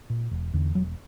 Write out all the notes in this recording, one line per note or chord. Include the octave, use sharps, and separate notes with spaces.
A#2
E1
E2 D3
E1 F#3